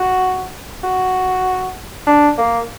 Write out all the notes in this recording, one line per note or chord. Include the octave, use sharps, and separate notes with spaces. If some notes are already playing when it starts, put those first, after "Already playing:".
Already playing: F#4
F#4
D4
A#3